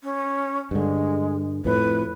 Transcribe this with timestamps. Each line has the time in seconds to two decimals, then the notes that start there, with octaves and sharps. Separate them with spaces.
0.04 C#4
0.71 G2 D3 G#3
1.65 F2 A2 B4